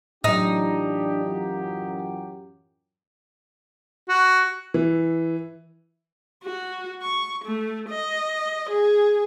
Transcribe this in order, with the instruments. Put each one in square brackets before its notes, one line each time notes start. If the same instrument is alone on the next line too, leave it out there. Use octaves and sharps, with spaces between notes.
[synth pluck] A2 F#3 [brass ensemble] E3 F4 G4 [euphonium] D4 [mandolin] D#4
[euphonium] F#2
[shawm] F#4
[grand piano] E3
[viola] F#4
C#6
A3
D#5
G#4